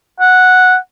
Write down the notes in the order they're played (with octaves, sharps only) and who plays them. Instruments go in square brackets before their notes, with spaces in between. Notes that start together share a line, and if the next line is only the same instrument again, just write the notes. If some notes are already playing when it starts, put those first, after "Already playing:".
[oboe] F#5